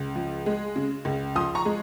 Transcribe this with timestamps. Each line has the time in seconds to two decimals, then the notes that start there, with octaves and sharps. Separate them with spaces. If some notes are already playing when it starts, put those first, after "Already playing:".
Already playing: C#2
0.15 F3
0.46 G#3
0.76 C#3
1.05 C#2
1.35 F3 C6 D#6
1.55 A#5 C#6
1.65 G#3